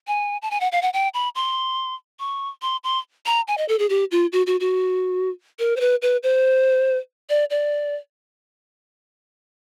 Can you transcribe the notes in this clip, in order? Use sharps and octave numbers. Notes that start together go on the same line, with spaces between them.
G#5
A5
G#5
F#5
F5
F#5
G5
B5
C6
C#6
C6
C6
A#5
G#5
D#5
A4
G#4
G4
F4
F#4
F#4
F#4
A#4
C5
B4
B4
C5
D5
D5